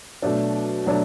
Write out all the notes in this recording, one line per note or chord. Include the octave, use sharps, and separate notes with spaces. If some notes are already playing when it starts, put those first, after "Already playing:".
B2 F#3 A3 D4
B2 F#3 A3 D4